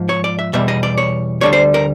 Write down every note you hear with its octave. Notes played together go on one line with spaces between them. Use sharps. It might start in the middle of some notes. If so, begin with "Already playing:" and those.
Already playing: G#2 F3
C#5
D5
E5
E2 B2 G3 E5
D#5
D5
C#5
D2 D3 G3 C#5
C5
A#4